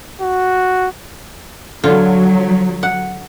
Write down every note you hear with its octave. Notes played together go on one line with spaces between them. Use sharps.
F#4
D3 F#3 F4
F#5